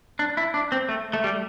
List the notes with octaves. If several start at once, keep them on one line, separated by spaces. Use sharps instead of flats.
D4
E4
D4
C4
A3
A3
G3